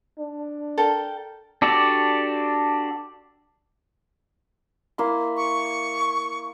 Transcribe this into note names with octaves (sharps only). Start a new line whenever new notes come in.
D4
A4 A#4 G5
D4 F#4 G4 A4 D5
A#3 E4 C6
C#6